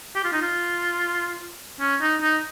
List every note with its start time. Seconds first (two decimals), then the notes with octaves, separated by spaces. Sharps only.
0.15 G4
0.24 F4
0.33 D#4
0.42 F4
1.81 C#4
2.01 D#4
2.22 D#4